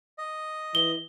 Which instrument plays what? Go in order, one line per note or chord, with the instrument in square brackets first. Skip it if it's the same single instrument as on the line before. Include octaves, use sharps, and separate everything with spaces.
[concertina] D#5
[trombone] E3 [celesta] G7